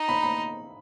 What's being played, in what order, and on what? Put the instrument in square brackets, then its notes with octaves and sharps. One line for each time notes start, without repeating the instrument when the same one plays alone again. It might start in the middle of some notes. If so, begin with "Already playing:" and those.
Already playing: [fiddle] D#4
[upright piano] B5
B5